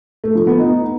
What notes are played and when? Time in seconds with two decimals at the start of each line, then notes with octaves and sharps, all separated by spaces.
0.24 A3
0.35 F3
0.47 B3
0.59 D#4